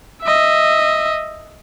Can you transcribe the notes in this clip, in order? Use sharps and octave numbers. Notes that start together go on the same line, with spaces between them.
D#5 E5